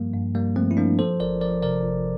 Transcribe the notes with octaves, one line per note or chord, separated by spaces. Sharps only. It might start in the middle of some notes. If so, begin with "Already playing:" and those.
Already playing: G2 F3 G3 A#3
G2
G2 G3 A#3
F3 A3 C4
E4
F3 A#3 D4
F3 A4 C5
G1 A#4 D5
F3 A#4 D5
C3 A#4 D5
G1